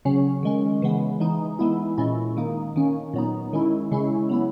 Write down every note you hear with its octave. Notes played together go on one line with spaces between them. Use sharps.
C#3 F#3 C#4
D#3 G#3 C#4
C#3 E3 G#3 B3
E3 G#3 D#4
E3 G#3 B3 E4
A#2 G#3 C#4 E4
D#3 A#3 D#4
D#3 A#3 C#4
A#2 F#3 B3 D#4
D#3 G#3 C#4 E4
C#3 G#3 C#4 E4
F#3 B3 E4